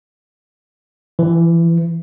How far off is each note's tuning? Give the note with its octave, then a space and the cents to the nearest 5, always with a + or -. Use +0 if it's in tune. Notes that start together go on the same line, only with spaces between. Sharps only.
E3 +25